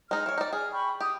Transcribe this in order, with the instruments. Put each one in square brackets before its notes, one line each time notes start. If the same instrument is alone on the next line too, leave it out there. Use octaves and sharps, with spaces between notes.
[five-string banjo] G#3 D#4 [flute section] F6
[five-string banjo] E3 C#5
D#4 D5
[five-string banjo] G#4 [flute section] G#5 F6
[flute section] G5 B5 C#6
[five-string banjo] G4 [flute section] D#6